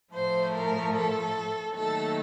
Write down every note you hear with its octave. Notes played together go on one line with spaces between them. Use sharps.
A2 F3 A3 C5
A#4
A4
D#2 D#3 F#3 A3 A4